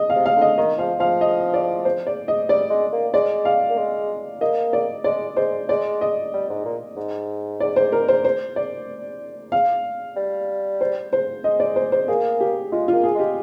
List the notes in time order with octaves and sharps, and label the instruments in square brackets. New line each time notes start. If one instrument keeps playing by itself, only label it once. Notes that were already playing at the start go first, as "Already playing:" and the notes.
Already playing: [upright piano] D#5
F5
[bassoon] C3
[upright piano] F5
[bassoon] D3 [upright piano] D#5
[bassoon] D#3 [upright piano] D#5
[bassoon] F3 [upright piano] F5
[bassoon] F3 [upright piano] F5
[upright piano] D#5
D5
C5
D5
D#5
[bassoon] G3 [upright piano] D5
[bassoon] G#3
A#3
[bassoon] G#3 [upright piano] D5
[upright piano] F5
[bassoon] A#3
G#3
[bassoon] A#3 [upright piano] D#5
[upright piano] D5
[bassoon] G#3 [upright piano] D5
[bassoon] G#3 [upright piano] C5
[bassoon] G#3 [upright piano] D5
[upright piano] D#5
[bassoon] G3
G#2
A#2
G#2
[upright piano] D5
C5
A#4
C5
C5
D5
F5
[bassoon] G3
[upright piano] C5
C5
[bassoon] G#3 [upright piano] D#5
[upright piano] D5
C5
C5
[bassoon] A#3 [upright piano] G#4
[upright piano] G4
[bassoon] G#3 [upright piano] F4
[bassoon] A#3 [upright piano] F4
[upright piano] G#4
[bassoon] G#3 [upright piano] G4